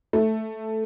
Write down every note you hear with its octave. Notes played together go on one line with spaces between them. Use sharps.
A3